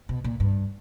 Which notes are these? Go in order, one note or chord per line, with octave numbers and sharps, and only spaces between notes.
B2
A#2
G2